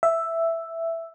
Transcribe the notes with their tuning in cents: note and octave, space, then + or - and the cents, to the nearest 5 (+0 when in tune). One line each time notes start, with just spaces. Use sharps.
E5 +5